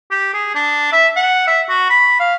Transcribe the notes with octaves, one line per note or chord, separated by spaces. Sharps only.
G4
G#4
D4
E5
F#5
E5
F#4
B5
F5